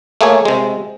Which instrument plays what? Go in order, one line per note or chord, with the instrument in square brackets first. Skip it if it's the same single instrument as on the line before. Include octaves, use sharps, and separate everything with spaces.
[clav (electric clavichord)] A3 A#3 G#4 C#5
C3 G#3